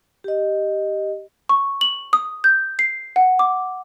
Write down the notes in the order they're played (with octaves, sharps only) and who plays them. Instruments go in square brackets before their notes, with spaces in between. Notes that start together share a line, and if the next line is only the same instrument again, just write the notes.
[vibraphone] G4 D#5
[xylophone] C#6
F#7
D#6
G6
C7
F#5
D6